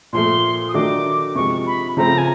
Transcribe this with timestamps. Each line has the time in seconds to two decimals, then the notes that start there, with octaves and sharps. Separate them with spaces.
0.13 A#2 F3 A3 C6
0.69 D#6
0.74 D#3 F#3 A3 D4 F#4 D6
1.35 C3 F3 G#3 C#6
1.66 B5
1.97 C#3 F3 A3 C4 A#5
2.18 G#5